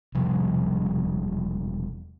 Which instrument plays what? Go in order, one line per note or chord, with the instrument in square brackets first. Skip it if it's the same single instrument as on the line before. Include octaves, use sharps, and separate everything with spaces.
[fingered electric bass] E1 C3 F3 G3